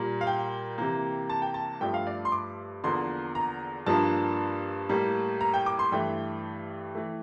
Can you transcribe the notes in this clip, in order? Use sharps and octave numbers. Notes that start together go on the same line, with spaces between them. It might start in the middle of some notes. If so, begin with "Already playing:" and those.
Already playing: A#2 G3 A#3
F5
G5
C3 E3 A#3
A5
G5
A5
G2 F3 A3 G5
F5
D5
C6
D6
E2 D3 F3 A#3 C6
A#5
G2 F3 A#3 D4 A5
A2 G3 A#3
A#5
G5
D6
C6
G2 E3 A3 G5
E3 A3